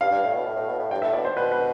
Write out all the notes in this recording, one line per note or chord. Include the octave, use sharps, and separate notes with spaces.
G2 F5
G2
A2
B2
A2
A2
B2
A2
G2 G5
A2 E5
B2 D5
C5
B2 B4
B4